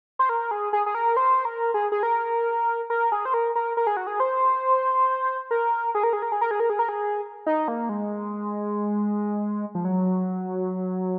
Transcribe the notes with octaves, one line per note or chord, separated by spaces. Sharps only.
C5
A#4
G#4
G#4
G#4
A#4
C5
A#4
G#4
G#4
A#4
A#4
G#4
C5
A#4
A#4
A#4
G#4
F#4
G#4
C5
A#4
G#4
A#4
G#4
A#4
G#4
A#4
G#4
A#4
G#4
A#4
G#4
D#4
A#3
G#3
F3
F#3